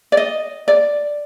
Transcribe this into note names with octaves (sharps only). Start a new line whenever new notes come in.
D5
D#5
D5